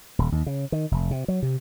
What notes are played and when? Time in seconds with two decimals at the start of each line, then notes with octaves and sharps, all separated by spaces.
0.19 D#1
0.32 D#2
0.46 C#3
0.72 D#3
0.91 F1
1.11 C3
1.28 F#3
1.43 C3